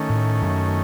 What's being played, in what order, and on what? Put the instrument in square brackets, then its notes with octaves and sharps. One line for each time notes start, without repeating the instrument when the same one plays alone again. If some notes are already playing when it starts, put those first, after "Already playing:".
Already playing: [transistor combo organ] D#3 A3 C#4
[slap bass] A2
F#2